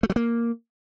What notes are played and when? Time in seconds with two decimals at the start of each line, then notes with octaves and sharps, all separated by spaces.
0.03 A3
0.10 F#3
0.16 A#3